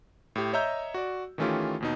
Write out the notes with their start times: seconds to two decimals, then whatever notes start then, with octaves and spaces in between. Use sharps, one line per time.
0.36 A2 G4
0.53 C#5 D#5 E5 A#5 E6 G6
0.94 F#4 D5
1.38 D#3 E3 A3 C#4 F4 G4
1.80 D#2 B2 D#4